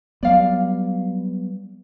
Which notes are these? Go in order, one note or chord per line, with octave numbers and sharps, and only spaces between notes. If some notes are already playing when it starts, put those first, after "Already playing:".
F#3 G3 B3 D5 F5